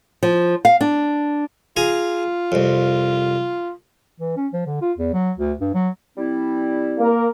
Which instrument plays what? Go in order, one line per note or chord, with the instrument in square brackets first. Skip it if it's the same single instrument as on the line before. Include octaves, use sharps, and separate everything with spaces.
[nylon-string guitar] F3
F5
D4
[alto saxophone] F4 [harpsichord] G#4 G#5 A#5
[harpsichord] C2 F2
[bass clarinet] E3
C#4
F3
D3
F4
E2
F#3
D2
G2
F#3
[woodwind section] G3 C4 E4
[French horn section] A#3 A#4